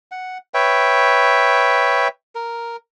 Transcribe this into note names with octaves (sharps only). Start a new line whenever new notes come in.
F#5
B4 C#5 E5 G5
A#4